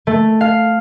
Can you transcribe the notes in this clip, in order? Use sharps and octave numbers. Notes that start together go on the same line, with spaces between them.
A3
F5